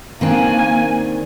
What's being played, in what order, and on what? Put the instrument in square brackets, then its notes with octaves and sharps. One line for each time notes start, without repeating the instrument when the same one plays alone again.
[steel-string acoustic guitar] D#3 C4 D4 [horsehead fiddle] A#3 G#5